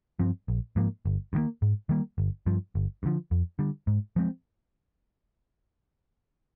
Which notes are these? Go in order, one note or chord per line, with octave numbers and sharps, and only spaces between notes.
G2 F3 C4
A#1
G#2 F3 A#3
G1
G2 D#3 A#3
G#2
D#3 G3 A#3
G1
G2 F3
G1
G2
D3 F3
F2
D3 G3
G#2
F3 G#3 C4